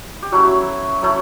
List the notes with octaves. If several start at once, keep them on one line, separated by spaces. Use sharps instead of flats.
G4
F#3 A3 C#4 E4 F#4
F#3 A3 C#4 E4